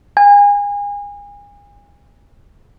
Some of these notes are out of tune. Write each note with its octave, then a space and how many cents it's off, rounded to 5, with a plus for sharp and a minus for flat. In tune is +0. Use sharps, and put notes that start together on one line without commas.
G#5 -35